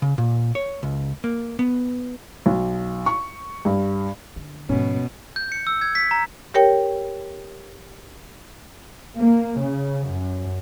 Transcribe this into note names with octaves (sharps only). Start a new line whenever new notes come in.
C#3
A#2
C#5
C#2
A#3
B3
B1
C#6
G2
D3
G#2 B2 F3 C#4
G6
C#7
E6
G#6
B6
A#5
G4 A#4 C#5 G5
A#3
C#3
F#2